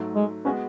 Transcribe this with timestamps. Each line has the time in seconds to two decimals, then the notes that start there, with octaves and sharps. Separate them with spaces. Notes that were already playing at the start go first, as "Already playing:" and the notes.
Already playing: G#2 F#3 A3
0.15 G#3
0.45 G#3 B3 C#4 F#4 B4